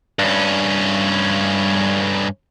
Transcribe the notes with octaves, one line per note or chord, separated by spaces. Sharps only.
G2 C#4